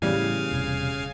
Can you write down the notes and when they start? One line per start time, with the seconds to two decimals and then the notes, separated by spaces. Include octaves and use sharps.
0.02 A2 C#3 E3 G3 B3 F5 G#5
0.52 E1 C3